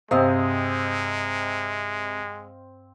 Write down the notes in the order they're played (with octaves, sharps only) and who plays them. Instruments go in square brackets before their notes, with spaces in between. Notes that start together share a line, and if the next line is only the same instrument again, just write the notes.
[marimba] G2 C5 [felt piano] C3 [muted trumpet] G#3 [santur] C4 D#5 F5